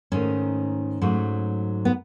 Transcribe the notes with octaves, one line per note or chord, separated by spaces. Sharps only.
G#2 D#3 A3 C#4
G#2 F#3 A3
B3